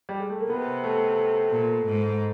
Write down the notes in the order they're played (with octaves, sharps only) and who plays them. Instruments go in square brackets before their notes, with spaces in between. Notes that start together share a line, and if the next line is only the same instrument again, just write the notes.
[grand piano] G3
G#3
A3
A#3
[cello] C3 [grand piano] B3
[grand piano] A3
[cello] A#2
G#2